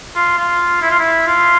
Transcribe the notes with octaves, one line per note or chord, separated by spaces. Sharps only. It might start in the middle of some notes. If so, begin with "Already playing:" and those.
F4
F4
E4
F4
E4
F4